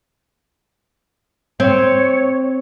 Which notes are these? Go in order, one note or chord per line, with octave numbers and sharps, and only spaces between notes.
C4 C#5